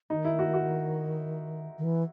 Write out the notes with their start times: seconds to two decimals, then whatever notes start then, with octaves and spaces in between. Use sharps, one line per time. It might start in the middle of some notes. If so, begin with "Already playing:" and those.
0.10 D#3 D#4
0.25 E4
0.39 F#4
0.54 F#4
1.78 D#3
1.84 E3